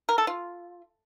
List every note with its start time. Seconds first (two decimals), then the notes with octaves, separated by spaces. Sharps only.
0.09 A#4
0.18 A4
0.27 F4